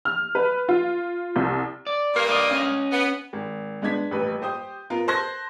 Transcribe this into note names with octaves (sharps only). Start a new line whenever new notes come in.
F6
B4
F4
C2
D5
G2 A#3
D5 D#5
C#4 D#5
B3
G#1
G#3 B3 D4 G#6 B6
D#1 A1 B4
G4 C5 D#6 G6
B3 F4 A#4
C5 A5 C6 F#6 G#6 A#6